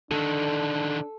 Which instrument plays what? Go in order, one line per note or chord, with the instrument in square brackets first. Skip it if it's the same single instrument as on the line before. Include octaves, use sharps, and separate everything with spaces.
[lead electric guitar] D3 D#3 [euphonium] D4 [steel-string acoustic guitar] A4